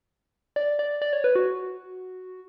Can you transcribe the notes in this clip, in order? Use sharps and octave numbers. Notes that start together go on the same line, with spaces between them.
D5
D5
D5
C#5
B4
F#4